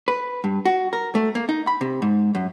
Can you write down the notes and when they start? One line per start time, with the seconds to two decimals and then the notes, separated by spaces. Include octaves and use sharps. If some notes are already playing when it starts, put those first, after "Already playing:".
0.08 B4
0.44 G2
0.65 F#4
0.93 A#4
1.15 A3
1.35 A#3
1.49 D#4
1.67 B5
1.81 C3
2.02 G#2
2.35 F#2